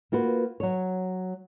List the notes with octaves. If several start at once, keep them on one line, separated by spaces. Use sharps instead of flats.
A#3 F4 F#4 B4
F#3 C#5